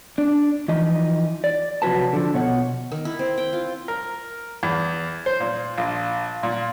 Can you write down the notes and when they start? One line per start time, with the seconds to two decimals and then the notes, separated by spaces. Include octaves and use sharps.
0.18 D4
0.68 E3 F3 D#4 D#5
1.44 D5
1.82 C3 F3 F#3 F#4 B4 A5
2.13 D3 F3
2.34 B2 C#5 F#5
2.92 D#3
3.05 E4
3.19 C4
3.38 G5
3.53 F4
3.88 A#4
4.63 E2
5.26 C5
5.40 A#2
5.78 A#1
6.43 A#2